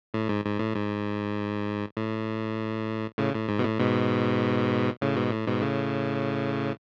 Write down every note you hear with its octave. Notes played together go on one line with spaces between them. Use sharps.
A2
G#2
G#2
A2
G#2
A2
A2 C#3
A2
G#2
B2
A2
G#2 B2
A2 C#3
G#2 B2
A2
G#2 B2
A2 C#3